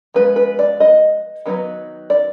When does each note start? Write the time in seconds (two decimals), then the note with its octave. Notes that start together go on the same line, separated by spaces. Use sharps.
0.14 F3 G#3 B3 B4
0.36 B4
0.59 D5
0.80 D#5
1.46 D#3 F#3 B3 D#4
2.10 D5